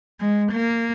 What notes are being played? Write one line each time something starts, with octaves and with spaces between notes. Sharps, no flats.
G#3
A#3